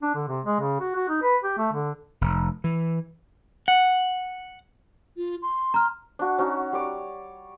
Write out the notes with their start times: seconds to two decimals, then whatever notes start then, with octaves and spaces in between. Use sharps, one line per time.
0.03 D4
0.15 D3
0.28 C3
0.45 G#3
0.60 C#3
0.80 F#4
0.96 F#4
1.09 D#4
1.23 B4
1.44 G4
1.58 A3
1.73 D3
2.21 F1
2.64 E3
3.68 F#5
5.17 F4
5.42 C6
5.74 A#5 F6
6.19 D4 F#4
6.38 C#4 D#4 F#4
6.73 G3 C#5 D5